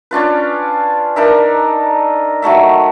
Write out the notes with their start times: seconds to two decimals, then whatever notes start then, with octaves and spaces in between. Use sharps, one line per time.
0.11 C#4 D4 F4 B4
1.16 D4 D#4 A#4 E5
2.42 D#3 F#3 A3 E5